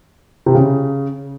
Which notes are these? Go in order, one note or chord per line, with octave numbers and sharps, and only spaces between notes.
C3
C#3